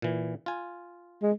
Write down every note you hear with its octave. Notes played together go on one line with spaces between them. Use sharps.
A#2 E3
F4 G#5
G#3